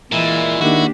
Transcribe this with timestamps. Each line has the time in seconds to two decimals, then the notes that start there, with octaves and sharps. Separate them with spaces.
0.12 A#2 E3 G#3 E4
0.61 D#3 A#3 D4 F#4 G4